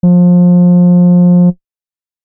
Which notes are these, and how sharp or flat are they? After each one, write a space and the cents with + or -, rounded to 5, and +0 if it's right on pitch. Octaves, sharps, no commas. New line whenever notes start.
F3 +25